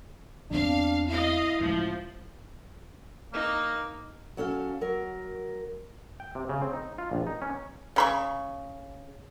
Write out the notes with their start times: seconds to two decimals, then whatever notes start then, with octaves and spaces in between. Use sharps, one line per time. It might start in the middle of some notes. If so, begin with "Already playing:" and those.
0.51 E2 C4 D4 F5
1.08 E4 D#5 F5
1.60 C#2 A2 F3
3.33 A#3 D#4
4.37 F#3 C#4 A4 F5
4.81 F#3 A#4
6.20 G5
6.35 C3
6.49 C#3
6.62 C4
6.73 D#4
6.98 F4
7.11 A#1
7.27 D#4
7.42 C#4
7.96 C#3 B5 C#6